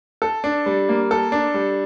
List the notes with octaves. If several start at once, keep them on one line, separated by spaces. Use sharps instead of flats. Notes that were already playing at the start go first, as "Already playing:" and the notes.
A4
D4
G3
A#3
A4
D4
G3